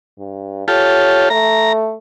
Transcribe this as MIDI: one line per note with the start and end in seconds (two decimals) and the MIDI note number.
0.18 0.63 43
0.68 1.29 65
0.68 1.29 67
0.68 1.29 69
0.68 1.28 73
1.30 1.95 57
1.30 1.73 82